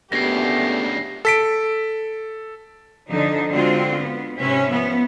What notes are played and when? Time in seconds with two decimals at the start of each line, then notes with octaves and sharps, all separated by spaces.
0.12 D2 A#2 C#3 A3 B3 G4 A#6 C7
1.25 A4 B6 D7
3.09 D3 F3 D4 D#4
3.50 D3 G#3 C4 F4 F#4
4.00 B3
4.36 G#2 C3 C#4 B4 E5
4.69 F3 B3